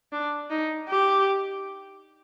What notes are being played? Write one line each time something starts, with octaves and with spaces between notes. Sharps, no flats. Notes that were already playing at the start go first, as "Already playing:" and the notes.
D4
D#4
G4